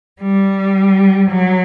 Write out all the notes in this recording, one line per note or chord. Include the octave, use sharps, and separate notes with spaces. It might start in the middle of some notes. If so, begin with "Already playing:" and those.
G3
F#3